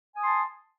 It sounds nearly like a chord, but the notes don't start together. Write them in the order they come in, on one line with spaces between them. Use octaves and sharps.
G#5 D#6 C6 A5